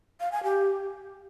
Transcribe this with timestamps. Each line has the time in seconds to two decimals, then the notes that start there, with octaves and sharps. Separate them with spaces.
0.20 F5
0.32 G#5
0.44 G4